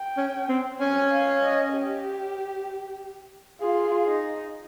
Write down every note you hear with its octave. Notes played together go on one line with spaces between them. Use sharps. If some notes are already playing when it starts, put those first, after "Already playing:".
Already playing: G5
C#4
C4
C#4 G#5
F5
D#5
G4
F4 G#4
D#4